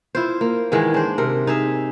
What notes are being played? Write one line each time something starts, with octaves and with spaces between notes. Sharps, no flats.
E4 F4 C5
A#3
G#2 D#3 E3 G#3
D4 C5
C3 A#4
D#4 G#4 E5